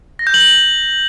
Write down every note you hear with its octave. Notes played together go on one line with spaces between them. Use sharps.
A#6
G6
F#7